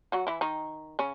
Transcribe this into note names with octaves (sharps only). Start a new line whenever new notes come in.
F#3 F#4
E3 E4
D#3 D#4
C#3 C#4